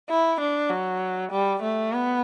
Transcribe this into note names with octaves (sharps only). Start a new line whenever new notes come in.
E4
D4
F#3
G3
A3
B3